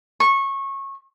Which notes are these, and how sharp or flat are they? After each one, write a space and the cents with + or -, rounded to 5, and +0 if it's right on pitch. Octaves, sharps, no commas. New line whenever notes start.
C#6 -20